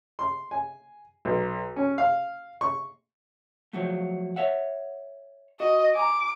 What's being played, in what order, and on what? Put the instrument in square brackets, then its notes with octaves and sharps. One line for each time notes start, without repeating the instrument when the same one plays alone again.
[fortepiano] C6
G#5
B1
C#4
F5
C#6
[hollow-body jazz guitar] F3 F#3 A3
C#5 E5 F#5
[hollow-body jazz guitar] F#4 [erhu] D#5
[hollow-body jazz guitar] G#5 A#5 [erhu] D6